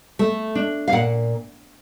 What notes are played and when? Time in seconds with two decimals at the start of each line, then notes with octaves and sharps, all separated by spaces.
0.19 A3
0.55 D4
0.88 F5
0.93 A#2 F#5